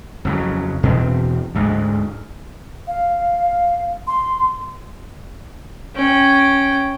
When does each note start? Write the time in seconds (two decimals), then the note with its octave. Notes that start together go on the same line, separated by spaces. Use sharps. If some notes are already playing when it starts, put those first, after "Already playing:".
0.25 F2 C#3 F#3
0.83 E2 B2 C4
1.55 D2 G#2
2.87 F5
4.07 C6
5.96 C#4 G5